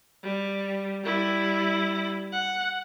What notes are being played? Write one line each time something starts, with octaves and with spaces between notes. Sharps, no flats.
G3
G3 E4
F#5